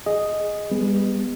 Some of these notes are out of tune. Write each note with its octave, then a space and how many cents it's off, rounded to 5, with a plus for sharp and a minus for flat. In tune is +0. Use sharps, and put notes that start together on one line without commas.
G#4 +0 D#5 +0
G3 +30 B3 +0